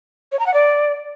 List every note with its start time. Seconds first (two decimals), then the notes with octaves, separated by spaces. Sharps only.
0.32 C#5
0.39 A#5
0.46 F#5
0.54 D5